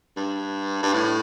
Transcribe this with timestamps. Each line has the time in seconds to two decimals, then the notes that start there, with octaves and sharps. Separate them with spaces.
0.16 G2
0.83 G2
0.94 A2